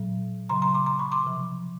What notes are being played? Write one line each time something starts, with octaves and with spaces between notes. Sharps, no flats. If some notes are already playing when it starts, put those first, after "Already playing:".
Already playing: A#2 F#3
C#3 F#3 A#5 C6
A#5 C6
C6 D6
A#5 C6
B5 C#6
C6 D6
C3 F3